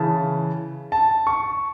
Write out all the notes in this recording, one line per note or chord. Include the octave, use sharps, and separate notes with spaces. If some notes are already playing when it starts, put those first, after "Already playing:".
Already playing: C#3 E3 A5
A5
C#6